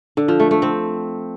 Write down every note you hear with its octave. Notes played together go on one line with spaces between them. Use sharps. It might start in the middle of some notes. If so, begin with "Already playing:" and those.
D3
F3
A3
A3
C4